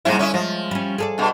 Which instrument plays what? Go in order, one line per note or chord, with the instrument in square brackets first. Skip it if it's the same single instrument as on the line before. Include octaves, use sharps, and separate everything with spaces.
[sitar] G#2 C3 E4 [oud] G3 A#3
[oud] D3 D#5 [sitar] C#4 E4
[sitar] F3 [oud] G#3
[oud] G3 C#4
G#4 A4 D5
[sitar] G2 B2